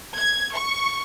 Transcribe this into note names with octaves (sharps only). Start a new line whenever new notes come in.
G#6
C#6